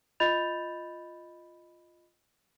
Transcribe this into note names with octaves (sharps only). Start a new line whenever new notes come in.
F4 D#5 B5 G6 A6 F7